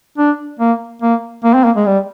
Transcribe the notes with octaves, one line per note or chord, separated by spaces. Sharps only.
D4
A#3
A#3
A#3
C4
A#3
G#3
G3